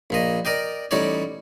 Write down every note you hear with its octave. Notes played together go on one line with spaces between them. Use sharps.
A#1 A#2 D#5
A#4 D5 D#5 G5
A1 G3 D#4 C#5 D5